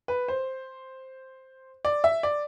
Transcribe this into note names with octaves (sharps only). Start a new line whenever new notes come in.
B4
C5
D5
E5
D5